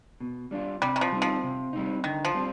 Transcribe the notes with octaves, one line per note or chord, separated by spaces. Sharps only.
B2
G3 D4 F4
C3 G3
D#3
F3
G3 C4 D#4
F3
C3
G3 C4 D#4
D3 D#3
F3
G3 C4 F4